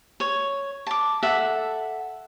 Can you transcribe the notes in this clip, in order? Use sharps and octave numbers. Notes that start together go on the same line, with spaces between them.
C#5
A5 D6
A4 E5 F#5